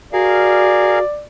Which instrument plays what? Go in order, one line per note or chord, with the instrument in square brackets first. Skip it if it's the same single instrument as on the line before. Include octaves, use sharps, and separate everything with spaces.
[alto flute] F#4 [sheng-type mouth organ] G#4 A#4 F5 [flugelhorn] D5